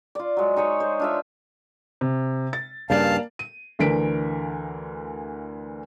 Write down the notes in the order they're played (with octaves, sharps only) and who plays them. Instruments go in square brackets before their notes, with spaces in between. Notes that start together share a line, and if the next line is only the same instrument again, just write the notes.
[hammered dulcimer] F4 D5
F#3 G#3
D#4 G#4 C#5 C#6
C5 C#5
D4 F4 E5
[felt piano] C3
A6
[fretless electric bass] G2 C#3 [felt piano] A#3 D5 [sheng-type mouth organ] F5 A5
[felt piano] D#7
D2 D3 E3 A#4 B6 D7